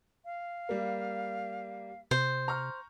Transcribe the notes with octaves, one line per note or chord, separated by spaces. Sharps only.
F5
G3 A#3
C3 C5
A#5 C#6 F6